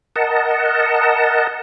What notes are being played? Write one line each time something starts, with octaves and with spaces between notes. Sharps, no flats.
A#4 D#5 F#5 A5